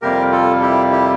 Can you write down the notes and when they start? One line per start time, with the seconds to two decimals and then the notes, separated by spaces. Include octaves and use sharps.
0.02 F2 C3 G3 A#3 G4 A#4
0.32 F4 A4
0.62 E4 G4
0.91 E4 G4